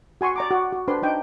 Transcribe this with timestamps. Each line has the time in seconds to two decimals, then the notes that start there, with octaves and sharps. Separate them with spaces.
0.21 F#4 G#5 C6 C#6
0.36 D5 A#5 D6
0.51 F#4
0.73 F#4
0.88 D4 B4 C5 D5 C6
1.02 D4 D#4 G5